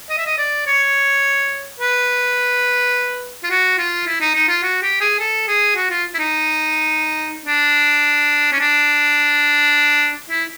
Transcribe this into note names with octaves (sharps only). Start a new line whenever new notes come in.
D#5
E5
D#5
D5
C#5
B4
F4
F#4
F4
E4
D#4
D#4
F4
F#4
G4
G#4
A4
G#4
F#4
F4
E4
D#4
D4
C#4
D4
E4